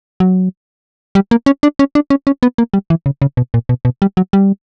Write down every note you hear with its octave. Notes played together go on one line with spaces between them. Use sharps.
F#3
G3
A#3
C#4
D4
C#4
D4
C#4
C#4
B3
A#3
G3
E3
C#3
C#3
B2
A#2
B2
B2
G3
F#3
G3